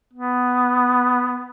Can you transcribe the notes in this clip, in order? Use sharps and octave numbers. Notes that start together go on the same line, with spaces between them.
B3